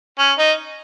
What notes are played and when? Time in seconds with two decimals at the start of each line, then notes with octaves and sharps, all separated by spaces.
0.19 C#4
0.38 D#4